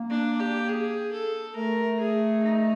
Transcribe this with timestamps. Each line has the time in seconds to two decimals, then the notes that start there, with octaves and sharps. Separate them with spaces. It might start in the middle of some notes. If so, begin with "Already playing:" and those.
Already playing: A#3
0.10 D4
0.40 G4
0.69 G#4
1.12 A4
1.56 A3 A#4
1.99 G#4
2.43 D#4